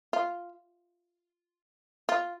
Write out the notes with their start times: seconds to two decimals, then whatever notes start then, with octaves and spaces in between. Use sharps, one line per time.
0.13 F4
2.09 F4